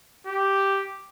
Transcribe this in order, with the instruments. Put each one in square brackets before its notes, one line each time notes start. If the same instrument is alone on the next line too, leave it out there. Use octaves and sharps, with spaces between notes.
[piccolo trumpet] G4